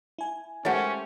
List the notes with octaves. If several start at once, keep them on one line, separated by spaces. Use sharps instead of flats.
E4 G#5
G#3 A3 C#4 G4 A#4 C5 C#5 F#5